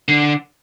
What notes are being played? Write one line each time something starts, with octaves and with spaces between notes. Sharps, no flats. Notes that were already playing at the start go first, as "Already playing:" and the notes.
D3